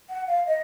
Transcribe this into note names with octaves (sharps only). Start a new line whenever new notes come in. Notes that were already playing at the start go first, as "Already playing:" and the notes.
F#5
F5
D#5